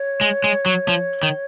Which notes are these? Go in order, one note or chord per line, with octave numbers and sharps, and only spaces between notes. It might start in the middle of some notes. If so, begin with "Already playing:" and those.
Already playing: C#5
G#3
G#3
F#3
F3
D#3